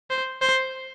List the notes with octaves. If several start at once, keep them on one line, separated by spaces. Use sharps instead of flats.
C5
C5